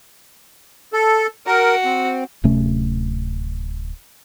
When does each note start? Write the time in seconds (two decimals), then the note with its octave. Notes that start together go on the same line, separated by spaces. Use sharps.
0.93 A4
1.46 F#4 A#4
1.85 C4
2.44 D1 C3 A3 C#4